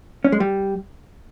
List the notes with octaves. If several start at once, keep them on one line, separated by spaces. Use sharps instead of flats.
C#4
G#3
G3